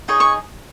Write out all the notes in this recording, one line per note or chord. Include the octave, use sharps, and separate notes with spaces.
D#4 G#4 C#5
C#6